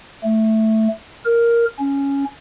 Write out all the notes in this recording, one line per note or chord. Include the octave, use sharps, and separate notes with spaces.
A3
A#4
C#4